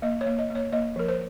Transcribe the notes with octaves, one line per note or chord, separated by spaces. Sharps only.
A#3 D#5
C#5
A#3
D#5
A#3
C#5
A#3 D#5
F3 A#4
C5